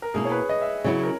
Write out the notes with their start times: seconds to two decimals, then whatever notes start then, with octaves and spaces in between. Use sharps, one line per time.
0.02 A#4
0.14 B2 A#3 E4 G#4
0.25 C#5
0.32 B4
0.49 D#5
0.62 E5
0.84 C#3 F#3 B3 E4 C#5
1.03 A#4